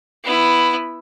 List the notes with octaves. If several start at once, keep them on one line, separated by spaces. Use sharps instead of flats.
B3 E4